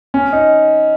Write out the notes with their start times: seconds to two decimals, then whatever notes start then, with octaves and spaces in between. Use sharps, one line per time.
0.14 C#4
0.33 D#4